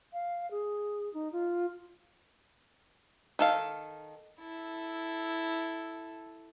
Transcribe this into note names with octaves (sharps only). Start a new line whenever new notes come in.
F5
G#4
D#4
F4
D#3 A4 F5
E4 A4